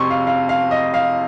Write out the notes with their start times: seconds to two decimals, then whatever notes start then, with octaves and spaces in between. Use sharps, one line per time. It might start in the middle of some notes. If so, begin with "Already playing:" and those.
Already playing: F2 C3 C6 C#6
0.10 F5
0.27 F5
0.49 F5
0.71 D#5
0.94 F5